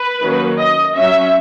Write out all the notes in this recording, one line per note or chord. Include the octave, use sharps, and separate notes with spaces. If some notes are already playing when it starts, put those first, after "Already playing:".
Already playing: B4
D#3 F#3 A#3 C#4
D#5
F#3 C#4 E5